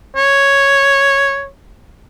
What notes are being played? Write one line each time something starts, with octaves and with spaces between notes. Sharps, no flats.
C#5